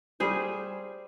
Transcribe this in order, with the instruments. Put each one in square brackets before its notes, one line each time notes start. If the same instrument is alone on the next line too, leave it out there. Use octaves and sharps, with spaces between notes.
[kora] G3 G#4 C5